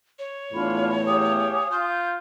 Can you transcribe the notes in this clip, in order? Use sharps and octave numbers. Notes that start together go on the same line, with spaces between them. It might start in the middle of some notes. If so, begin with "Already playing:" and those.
C#5
E2 A2 D4 F4 B5
G4 F5 G#5 D#6
F4 G6